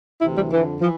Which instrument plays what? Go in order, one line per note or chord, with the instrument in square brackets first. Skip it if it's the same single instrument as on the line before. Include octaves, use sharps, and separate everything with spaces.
[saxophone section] D2 C3 E3 E4
G3
F2 D3 E3
E3 F3